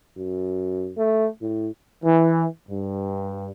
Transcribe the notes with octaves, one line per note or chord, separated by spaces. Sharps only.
F#2
A3
A2
E3
G2